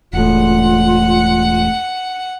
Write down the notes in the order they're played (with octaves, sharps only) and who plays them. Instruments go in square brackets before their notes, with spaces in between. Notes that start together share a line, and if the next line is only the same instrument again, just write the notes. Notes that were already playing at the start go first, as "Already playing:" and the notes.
[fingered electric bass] E1 A2 [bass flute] F4 [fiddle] F#5